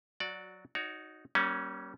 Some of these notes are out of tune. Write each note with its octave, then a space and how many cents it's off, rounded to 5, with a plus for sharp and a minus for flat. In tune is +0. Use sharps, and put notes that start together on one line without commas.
F#3 +0 F#4 -15 D5 +0
D#4 +0 F#4 +0 C#5 +35
G3 -30 A#3 +25 C#4 +0